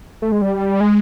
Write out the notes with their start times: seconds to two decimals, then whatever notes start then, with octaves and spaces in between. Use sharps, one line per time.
0.22 A3
0.32 G#3
0.42 G3
0.80 G#3